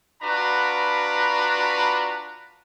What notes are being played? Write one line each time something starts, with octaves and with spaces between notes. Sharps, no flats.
D4 F4 F#4 B4 A#5 B5